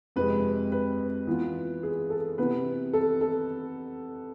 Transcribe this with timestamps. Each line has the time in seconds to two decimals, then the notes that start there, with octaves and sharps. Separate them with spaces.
0.16 F2 C3 G#3 B4
0.72 B4
1.27 E3 B3 F4
1.83 G#4
2.10 A4
2.38 C3 E3 B3 B4
2.93 A4
3.21 A4